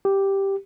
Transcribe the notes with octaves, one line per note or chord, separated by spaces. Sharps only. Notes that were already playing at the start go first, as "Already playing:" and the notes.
G4